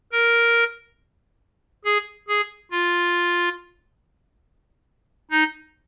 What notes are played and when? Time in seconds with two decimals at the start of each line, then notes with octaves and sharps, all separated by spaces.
0.12 A#4
1.85 G#4
2.28 G#4
2.71 F4
5.31 D#4